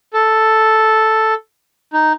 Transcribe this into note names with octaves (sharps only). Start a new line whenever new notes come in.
A4
D#4